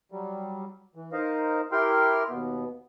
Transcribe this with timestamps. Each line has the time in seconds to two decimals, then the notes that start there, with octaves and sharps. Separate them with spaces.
0.12 F#3 G3
0.95 E3
1.13 D#4 A#4 C5 D#5 F5
1.72 E4 G4 A#4 G5 C6 F6
2.29 D#2 B2 B3